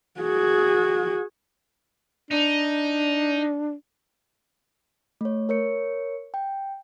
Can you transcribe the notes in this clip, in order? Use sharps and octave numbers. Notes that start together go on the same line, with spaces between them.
F#4 G#4
D4 D#4
A3 C#5
A#4 C#5 C#7
G5